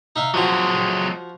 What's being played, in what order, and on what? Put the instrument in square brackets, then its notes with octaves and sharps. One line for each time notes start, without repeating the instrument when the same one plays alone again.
[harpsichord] D#4 E5 F5
[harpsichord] F3 F#4 [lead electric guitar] F#3 G#3